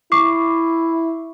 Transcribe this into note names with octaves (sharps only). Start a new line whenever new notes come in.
E4 C#6 D6 C7